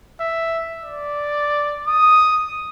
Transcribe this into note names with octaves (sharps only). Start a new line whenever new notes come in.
E5
D5
D#6